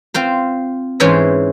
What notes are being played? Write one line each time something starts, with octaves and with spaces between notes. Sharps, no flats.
C4 F4 C5
G#2 E3 C#4 C5 C#5 E5